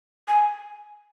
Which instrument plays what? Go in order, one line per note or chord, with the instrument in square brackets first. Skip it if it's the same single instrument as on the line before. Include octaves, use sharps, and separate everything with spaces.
[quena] G#5